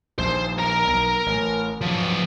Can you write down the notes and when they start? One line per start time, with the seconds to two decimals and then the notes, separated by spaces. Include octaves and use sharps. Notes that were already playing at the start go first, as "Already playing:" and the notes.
0.19 A#1 D#2 C5
0.58 A#4 A#5
0.87 B1
1.26 A1
1.81 F3 F#3 B3